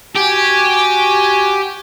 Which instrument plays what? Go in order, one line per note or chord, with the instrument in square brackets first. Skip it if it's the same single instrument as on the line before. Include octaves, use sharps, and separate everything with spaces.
[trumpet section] F#4 G#5 [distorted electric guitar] G4